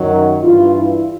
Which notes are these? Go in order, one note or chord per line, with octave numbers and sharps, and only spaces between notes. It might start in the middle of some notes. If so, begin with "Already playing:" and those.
Already playing: F#2 D#3 F#3
G2 E3 F4
E4